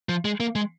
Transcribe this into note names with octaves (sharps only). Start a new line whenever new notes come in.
F3
G#3
A#3
G#3